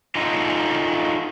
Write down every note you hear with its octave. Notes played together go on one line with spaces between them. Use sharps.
D#4 F4 F#4 A4 D#5 G#5